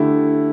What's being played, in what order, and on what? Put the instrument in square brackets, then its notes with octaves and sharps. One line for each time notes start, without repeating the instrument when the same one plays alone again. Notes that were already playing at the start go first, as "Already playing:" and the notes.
Already playing: [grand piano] D3 A3 E4 G4